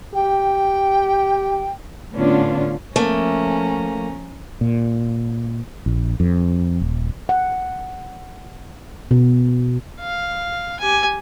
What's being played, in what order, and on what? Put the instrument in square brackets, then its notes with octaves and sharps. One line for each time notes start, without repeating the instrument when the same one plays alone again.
[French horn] G4 [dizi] G5
[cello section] A2 D3 B3 C#4 D4 F4
[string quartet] F3 C#4 A#5 [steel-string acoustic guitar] A3 A#3
[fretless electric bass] A#2
A#1
F2
D#1
[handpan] F#5
B2
[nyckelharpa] F5
G4 G#5